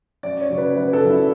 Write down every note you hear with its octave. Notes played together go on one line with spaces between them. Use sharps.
F#2 D5
C#5
C#3 F#3
B4
F#2 B4
B4
A4
C#3 F#3
E4